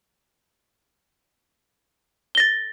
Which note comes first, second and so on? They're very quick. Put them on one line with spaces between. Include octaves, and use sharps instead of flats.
G7 A#6 A6